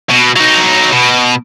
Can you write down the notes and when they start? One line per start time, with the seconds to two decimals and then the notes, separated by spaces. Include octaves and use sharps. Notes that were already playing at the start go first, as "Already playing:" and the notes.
0.10 B2
0.36 F#3 D#4
0.93 B2